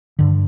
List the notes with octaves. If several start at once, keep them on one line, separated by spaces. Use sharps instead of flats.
G2 D3